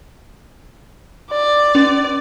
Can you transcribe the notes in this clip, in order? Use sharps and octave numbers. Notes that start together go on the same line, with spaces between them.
D5
C#4